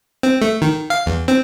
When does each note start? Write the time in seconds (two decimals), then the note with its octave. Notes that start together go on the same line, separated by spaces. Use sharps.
0.23 C4
0.41 A3
0.62 D#3
0.90 F5
1.06 E2
1.28 C4